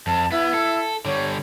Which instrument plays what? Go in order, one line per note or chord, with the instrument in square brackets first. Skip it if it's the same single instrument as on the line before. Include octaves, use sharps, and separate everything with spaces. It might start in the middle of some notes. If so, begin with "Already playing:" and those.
[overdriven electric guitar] F2 [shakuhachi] A5
[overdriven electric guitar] B3 [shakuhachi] E4
[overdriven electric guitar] A4
[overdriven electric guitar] D3 G3 [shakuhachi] C#5